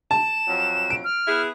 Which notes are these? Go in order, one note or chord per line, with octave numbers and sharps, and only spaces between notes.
A5 E7
F2 F#3
D7
F6
B3 E4 G#4